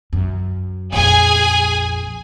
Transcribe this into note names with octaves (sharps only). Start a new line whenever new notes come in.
F#2
A#1 F2 G#4 G#5